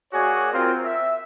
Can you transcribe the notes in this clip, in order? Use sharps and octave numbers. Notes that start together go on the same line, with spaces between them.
A#3 F#4 G#4 C#5 D5 G#5
C4 F4 A#4
E5